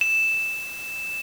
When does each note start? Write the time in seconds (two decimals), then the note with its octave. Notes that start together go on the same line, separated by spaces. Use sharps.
0.01 E7